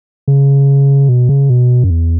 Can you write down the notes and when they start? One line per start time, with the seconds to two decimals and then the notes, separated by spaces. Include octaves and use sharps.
0.28 C#3
1.09 B2
1.29 C#3
1.50 B2
1.84 F#2
1.90 E2